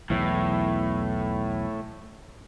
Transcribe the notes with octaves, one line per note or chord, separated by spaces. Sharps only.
B1 E2 A2 E3